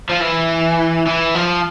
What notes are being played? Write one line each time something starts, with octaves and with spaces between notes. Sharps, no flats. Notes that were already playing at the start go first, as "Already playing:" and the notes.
F3
E3
E3
F3